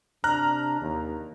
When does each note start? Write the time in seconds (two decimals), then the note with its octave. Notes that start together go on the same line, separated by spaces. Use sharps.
0.24 C3 D4 A#5 F6 F#6
0.80 D#2